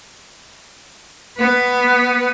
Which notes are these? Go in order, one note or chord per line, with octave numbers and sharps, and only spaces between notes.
B3 B4